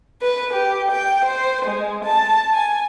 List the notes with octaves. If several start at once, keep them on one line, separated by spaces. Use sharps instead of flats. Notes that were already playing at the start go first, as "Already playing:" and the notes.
B4
G4
G5
C5
G#3
A5
G#5